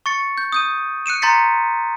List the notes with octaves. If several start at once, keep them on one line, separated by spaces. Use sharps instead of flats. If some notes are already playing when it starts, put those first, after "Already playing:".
C#6 A6 C#7
G6
D#6 G6 D#7
F#6 C#7 D#7 E7
A#5 C6 G6 A6 B6 C#7